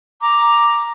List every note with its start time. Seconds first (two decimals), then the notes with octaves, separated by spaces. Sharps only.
0.21 A#5 D6